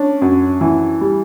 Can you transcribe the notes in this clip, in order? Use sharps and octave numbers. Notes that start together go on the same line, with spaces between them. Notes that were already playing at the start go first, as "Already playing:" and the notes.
Already playing: C#4 D4
F#2
E3
G3